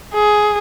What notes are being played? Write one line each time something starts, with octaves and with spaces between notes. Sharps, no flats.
G#4